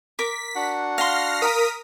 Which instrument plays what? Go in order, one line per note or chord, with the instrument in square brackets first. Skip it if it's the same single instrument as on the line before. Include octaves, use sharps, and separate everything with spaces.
[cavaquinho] A#4 D6 [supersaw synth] B6
[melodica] D4 F#4 F#5
[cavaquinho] F5 C6 [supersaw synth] F6 A#6 C7
[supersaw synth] A#4 D#6 B6